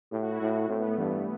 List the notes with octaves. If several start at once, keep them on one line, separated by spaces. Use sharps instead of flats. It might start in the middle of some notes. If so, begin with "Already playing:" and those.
A2 G4
F#4
E4
A2 F#4
F#4
E4
A2 C4
B3
A3
G2 E3